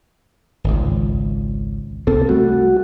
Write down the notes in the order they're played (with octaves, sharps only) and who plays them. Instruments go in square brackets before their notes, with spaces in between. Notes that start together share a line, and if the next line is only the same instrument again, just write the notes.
[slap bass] G#1 C#2
[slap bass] C2 A#3 C4 [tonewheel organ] A4
[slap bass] G3 A3 [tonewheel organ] F#4